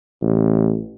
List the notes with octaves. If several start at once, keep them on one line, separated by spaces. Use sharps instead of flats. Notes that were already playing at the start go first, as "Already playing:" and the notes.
A1